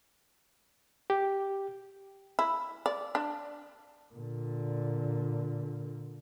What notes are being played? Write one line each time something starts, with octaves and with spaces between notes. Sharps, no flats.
G4
E4
D5
D4
A#2 D3